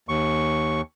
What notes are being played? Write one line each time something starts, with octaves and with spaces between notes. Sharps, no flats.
D#2 C#6